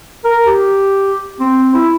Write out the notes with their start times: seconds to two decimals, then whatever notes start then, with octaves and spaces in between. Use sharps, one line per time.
0.24 A#4
0.47 G4
1.40 C4
1.74 E4